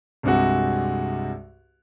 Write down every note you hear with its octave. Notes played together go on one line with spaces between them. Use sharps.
C2 G2 C3 G#3 F#4